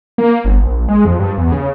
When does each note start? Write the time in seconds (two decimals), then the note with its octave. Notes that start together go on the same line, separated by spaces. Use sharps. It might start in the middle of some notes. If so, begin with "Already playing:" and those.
0.18 A#3
0.45 G1
0.62 A#1
0.88 G#3
1.05 F2
1.19 G2
1.38 E2
1.52 C#3